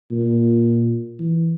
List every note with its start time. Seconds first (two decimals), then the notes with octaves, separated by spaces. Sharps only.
0.12 A#2
1.19 E3